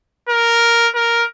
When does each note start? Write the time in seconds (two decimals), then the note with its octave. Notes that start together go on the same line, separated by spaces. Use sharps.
0.29 A#4
0.95 A#4